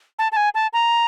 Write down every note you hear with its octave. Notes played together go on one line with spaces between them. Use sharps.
A5
A5
G#5
A5
A#5